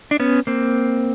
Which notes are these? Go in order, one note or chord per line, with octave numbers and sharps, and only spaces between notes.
D4
B3 C#4
A#3 C4